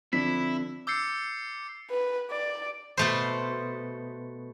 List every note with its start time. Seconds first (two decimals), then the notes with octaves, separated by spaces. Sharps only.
0.13 D3 F3 C4 D4 E4 B6
0.87 D6 E6 G6 A6 C7 C#7
1.90 B4
2.31 D5
2.97 B2 A3 C5